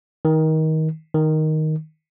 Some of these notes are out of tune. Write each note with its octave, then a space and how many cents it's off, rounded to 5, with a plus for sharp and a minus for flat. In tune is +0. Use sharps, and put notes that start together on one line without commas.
D#3 +25
D#3 +5